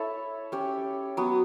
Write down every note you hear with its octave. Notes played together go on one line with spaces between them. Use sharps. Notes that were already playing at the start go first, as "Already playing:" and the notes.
Already playing: E4 A4 C#5 E5
C#4 G4 C#5
F#3 B3 F#4